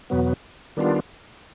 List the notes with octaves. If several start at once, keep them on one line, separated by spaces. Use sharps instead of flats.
E2 B2 F#3 B3
D#3 G3 B3 D4 F4